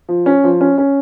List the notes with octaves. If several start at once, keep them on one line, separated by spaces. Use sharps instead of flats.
F3
C#4
F3
C#4
C#4